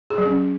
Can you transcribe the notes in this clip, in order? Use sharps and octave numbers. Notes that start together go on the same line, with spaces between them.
G#4
F#3
C#4